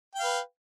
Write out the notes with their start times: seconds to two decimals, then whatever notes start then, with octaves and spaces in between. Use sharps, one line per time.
0.15 G5
0.19 F5
0.24 B4